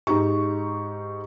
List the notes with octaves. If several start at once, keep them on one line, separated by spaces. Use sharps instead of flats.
G#2 D#4 G4 C#6